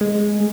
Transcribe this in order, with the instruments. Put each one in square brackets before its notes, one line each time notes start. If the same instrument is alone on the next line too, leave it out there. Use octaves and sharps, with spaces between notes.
[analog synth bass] G#3